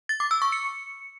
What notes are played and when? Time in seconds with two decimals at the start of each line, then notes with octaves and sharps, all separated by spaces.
0.09 A6
0.20 D6
0.31 E6
0.42 C#6
0.52 C#7